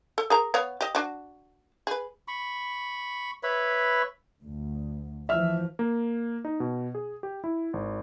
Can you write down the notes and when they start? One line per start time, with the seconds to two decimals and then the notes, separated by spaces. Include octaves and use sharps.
0.18 A4
0.30 G#4 A#4 A#5
0.54 B3 C#5 F5
0.81 G4 D#5
0.95 D4 F#4
1.87 G#4 B4
2.28 B5 C#6
3.43 B4 C#5 E5 B5
4.43 D2
5.29 E3 F3 E5 F6
5.79 A#3
6.45 D#4
6.60 B2
6.95 G#4
7.23 G4
7.44 E4
7.73 G#1